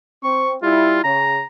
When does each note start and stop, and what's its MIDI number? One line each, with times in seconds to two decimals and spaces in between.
0.24 0.56 60
0.24 0.52 85
0.62 1.03 55
0.62 1.03 64
0.62 1.01 65
1.04 1.39 49
1.04 1.45 82